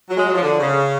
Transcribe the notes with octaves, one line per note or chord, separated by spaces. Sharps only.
F#3
G#3
F#3
F3
D3
C#3